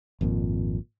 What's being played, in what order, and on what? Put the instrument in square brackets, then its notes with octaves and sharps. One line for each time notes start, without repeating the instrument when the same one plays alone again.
[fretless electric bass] G#1 F2 A#2